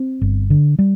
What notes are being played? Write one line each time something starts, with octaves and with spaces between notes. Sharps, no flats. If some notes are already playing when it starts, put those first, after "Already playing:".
Already playing: C4
G1
D3
G3